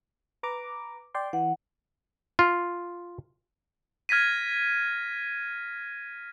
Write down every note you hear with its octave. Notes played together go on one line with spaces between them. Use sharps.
B4 A#5 D6
D5 G5 C6
E3 F#5
F4
F6 G#6 A#6 B6 D#7